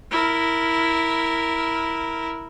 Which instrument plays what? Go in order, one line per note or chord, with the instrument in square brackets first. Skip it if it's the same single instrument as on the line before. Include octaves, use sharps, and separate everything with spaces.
[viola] E4 A#4